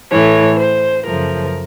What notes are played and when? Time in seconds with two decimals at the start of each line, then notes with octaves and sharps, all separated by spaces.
0.11 A2 E3 A3 C#5
0.59 C5
1.06 F#2 C#3 F3 A3 A#4